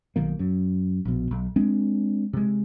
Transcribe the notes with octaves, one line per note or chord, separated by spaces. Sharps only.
B1 D#3 A#3
F#2
A#1 B2
B1
G#3 C4 D4
C3 G#3